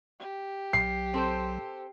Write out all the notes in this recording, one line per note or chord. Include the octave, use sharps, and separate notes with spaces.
G4
B1 F#3 C7
C4 A4 C5